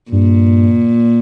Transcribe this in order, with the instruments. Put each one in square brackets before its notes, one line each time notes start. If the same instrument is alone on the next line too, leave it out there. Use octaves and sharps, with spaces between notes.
[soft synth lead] G2 [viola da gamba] A#2